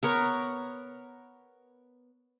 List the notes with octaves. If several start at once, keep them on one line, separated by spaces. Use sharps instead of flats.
B3 A#4 C#5